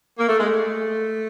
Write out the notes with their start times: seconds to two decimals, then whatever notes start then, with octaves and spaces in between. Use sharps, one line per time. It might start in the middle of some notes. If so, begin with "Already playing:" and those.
0.18 A#3
0.28 A3
0.39 G#3
0.48 A3